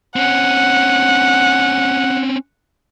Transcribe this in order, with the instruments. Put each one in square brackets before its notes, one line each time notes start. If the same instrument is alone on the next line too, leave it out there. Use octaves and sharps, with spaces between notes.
[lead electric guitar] C4 C#4 [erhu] F#5